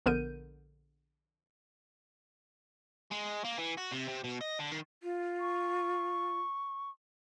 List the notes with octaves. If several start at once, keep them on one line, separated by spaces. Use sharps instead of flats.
A#1 D3 B3 A#4 G6 D#7
G#3
A#3
E3
F#4
C3
C3
B2
D#5
D3
D#3
F4
C#6